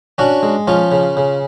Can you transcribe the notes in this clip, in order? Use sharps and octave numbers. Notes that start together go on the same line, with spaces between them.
C#4 D4 F#4
G#3
F3 C#4 F4
C#3
C#3